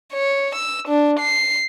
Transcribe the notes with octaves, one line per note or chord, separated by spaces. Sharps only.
C#5
E6
D4
C7